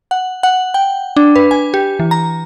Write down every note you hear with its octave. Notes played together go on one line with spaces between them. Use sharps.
F#5
F#5
G5
D4
B4
G#5
G4
E3
A#5